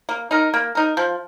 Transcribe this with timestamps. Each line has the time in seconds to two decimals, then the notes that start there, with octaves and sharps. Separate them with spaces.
0.09 A#3
0.31 D#4 A#4
0.54 A#3
0.75 D#4 A#4
0.97 F3